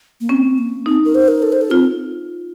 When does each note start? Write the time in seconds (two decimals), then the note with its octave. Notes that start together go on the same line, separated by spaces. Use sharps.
0.21 A#3
0.29 C4 C#4
0.58 A#3
0.86 C4 D#4
1.05 A#4
1.15 C5
1.28 A#4
1.42 A4
1.52 C5
1.61 A4
1.71 C4 F4